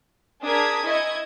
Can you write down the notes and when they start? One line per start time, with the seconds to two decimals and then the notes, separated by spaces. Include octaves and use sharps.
0.43 D4 G#4 A#4 D#6 G#6 B6
0.85 E4 D#5 C#6 G#6